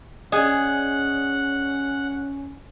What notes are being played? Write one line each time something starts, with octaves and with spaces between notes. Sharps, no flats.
C#4 G#4 D5 D#5 F#5 D#6